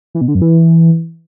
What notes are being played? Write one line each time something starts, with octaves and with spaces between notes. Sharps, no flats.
E3
B2
D3
F#2
E3